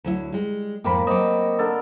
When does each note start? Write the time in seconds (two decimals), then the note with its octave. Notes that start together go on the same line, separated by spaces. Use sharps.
0.04 D2 F#3 E4
0.32 G3 G#3
0.84 F2 G#2 A#3 G5 B5
1.07 F#3 C4 D#5 D6
1.58 D3 A4 A#4